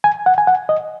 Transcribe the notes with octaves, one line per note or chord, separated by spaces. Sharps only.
G#5
F#5
G#5
F#5
D#5